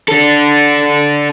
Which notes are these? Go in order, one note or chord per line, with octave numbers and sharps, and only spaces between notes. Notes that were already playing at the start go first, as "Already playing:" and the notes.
D4 A4